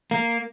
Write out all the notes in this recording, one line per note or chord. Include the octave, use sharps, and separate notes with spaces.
A#3